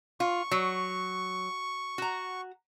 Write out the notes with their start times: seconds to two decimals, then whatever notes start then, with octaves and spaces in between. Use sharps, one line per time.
0.20 F4 C#6
0.51 F#3
1.98 F#4 A#5